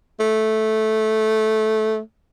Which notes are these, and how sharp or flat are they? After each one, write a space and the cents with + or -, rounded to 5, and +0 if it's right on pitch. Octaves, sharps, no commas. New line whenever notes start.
A3 -10